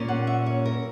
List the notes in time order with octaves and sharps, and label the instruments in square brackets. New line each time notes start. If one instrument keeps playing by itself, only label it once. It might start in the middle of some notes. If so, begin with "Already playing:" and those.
Already playing: [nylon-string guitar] A#2 A#3 C#4
F#5
E5
C#5
A#4